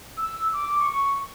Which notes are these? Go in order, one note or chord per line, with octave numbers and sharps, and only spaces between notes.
E6
D6
C#6